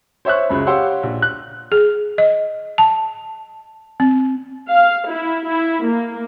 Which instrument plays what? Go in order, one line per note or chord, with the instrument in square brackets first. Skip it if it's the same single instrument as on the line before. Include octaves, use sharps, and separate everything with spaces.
[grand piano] C5 C#5 E5 C#6 F#6
C#2 F#2 B5
G4 C#5 F5 F#5 C6 E6
A#1
F#6
[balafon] G#4
D#5
A5
C4
[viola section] F5
E4
E4
A#3